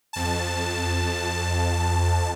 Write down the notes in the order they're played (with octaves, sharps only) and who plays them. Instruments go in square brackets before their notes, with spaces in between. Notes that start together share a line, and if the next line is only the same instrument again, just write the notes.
[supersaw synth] F2 A5